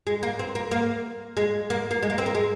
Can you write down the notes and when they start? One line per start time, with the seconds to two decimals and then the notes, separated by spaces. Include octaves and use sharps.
0.07 G#3
0.23 A#3
0.39 C4
0.55 A#3
0.71 A#3
1.37 G#3
1.70 A#3
1.91 A#3
2.03 G#3
2.10 A#3
2.18 C4
2.26 A#3
2.35 G#3